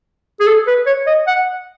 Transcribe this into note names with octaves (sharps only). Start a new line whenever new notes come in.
G#4
A4
B4
C#5
D#5
F#5